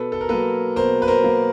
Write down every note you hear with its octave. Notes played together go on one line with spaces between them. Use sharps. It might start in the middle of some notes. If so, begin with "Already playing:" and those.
Already playing: B2 A4 B4
A4
A#4
F#3 A#3 A4 B4
B2 A#4 C5
B4
A#4 C5
F#3 A#3